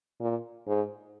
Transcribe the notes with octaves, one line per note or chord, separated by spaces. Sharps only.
A#2
G#2